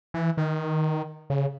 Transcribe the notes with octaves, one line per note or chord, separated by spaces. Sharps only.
E3
D#3
C#3